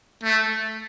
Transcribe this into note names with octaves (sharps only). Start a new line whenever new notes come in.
A3